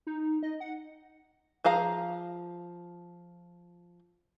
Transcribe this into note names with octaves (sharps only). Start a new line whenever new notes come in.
D#4
D#5
F#5
F3 G#4 F5 A#5